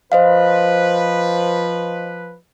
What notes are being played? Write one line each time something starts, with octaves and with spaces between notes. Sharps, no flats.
F3 B4 C5 D#5 F5